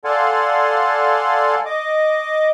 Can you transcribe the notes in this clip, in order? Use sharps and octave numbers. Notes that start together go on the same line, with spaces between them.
A4 D5 F5 F#5 G#5 C6
D#5 D6